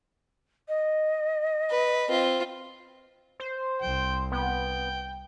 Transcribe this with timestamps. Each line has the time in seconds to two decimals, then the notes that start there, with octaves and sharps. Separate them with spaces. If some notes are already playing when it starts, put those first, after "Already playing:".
0.68 D#5
1.70 B4
2.08 C4 F4
3.40 C5
3.82 C2 G5
4.32 B3 G5